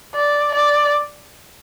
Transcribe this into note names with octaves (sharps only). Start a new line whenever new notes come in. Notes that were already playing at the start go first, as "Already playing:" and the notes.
D5
D5